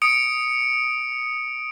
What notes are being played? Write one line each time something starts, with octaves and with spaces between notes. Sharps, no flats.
D#6 C#7 D7